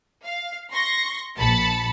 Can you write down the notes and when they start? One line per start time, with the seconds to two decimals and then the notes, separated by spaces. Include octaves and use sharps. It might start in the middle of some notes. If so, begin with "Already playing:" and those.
0.25 F5
0.72 C6 C#6 A#6
1.39 A#1 A5 B5 A6 C#7